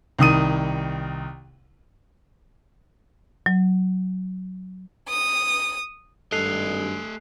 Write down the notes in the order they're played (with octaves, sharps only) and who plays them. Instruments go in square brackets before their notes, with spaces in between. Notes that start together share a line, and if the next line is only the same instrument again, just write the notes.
[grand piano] C2 D#3 D#6 D#7
[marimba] F#3
[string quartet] D#6
[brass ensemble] G#1 G2 [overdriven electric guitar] A3 D#5 [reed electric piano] A4 [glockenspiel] F#6 C7 F7